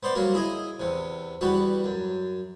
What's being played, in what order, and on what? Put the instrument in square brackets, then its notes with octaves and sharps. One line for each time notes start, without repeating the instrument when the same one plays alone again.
[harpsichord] B3 C5 D5
F#3 G3 A#3 A#4
E4 G#4 D#5
E2 C3
E2 G3 B3 F#4
F#2